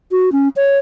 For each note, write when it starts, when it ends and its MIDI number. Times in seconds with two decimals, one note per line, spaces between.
0.11 0.32 66
0.32 0.48 61
0.56 0.78 73